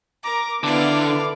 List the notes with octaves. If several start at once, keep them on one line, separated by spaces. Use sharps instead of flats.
A#4 A#5 D6
D3 B3 E4 A4 D5 F5